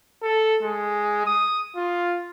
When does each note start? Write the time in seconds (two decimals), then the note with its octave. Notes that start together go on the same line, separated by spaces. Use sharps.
0.22 A4
0.63 G#3
1.26 D#6
1.77 F4